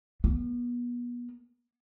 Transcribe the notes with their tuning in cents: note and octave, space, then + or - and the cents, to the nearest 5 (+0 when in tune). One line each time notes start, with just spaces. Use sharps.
B3 -30